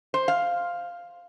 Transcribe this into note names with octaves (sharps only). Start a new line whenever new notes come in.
C5
F5